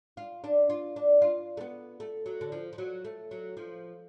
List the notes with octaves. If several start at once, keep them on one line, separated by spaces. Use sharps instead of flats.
F4
D4
F4
D4
F4
A3
B3
A3
F#3
D3
F3
F3
F#3
A3
F#3
F3